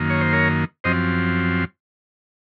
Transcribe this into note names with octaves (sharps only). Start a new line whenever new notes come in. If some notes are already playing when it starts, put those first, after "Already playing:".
Already playing: F#2 D#3 A#3
C#5
C5
A#4 C#5
F#2 F3 C4 C5 D#5